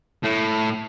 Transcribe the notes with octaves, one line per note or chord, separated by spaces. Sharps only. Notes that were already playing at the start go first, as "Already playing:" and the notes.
A2